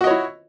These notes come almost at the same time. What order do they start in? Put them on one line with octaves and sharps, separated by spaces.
F#4 D#5 C#5 E4